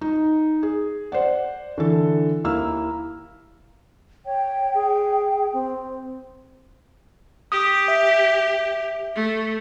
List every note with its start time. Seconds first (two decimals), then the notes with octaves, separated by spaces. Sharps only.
0.01 D#4
0.63 G#4
1.12 C5 D5 F#5
1.78 D3 E3 A4
2.44 D#2 A#3 E4 E6 F6
4.26 C#5 G5
4.74 G#4
5.53 C4
7.52 G4 D#6
7.88 E5
9.15 A3